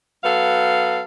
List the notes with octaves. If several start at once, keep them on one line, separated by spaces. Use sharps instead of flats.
F#3 B3 A4 F5